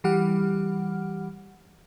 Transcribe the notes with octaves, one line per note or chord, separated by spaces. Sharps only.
E3 G3 G4 F#5 F6